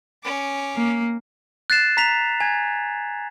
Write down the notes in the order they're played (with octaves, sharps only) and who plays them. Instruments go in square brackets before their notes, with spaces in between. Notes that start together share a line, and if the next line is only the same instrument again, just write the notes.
[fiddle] C#4 D6
[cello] A#3
[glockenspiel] F#6 A6 C7 E7
A#5 B6 F7
G#5 G#6